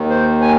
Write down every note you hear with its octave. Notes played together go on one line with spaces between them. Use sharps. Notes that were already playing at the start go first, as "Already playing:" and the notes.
Already playing: D#2 D#3
C5
G#5